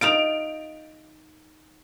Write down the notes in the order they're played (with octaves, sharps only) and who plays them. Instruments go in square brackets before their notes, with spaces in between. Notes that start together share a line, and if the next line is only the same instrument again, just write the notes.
[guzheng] D#4 F4 F5 [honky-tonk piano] D7 F7